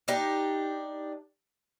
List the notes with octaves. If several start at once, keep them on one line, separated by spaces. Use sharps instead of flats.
D4 D#4 G4